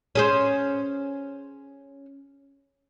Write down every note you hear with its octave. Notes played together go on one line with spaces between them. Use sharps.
C#4 G#4 C5